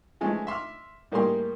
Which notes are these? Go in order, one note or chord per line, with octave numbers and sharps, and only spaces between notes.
E3 F3 G#3 A3 C#4
E5 C6 D6 F6
A2 G3 A#3 G4 G#4 C6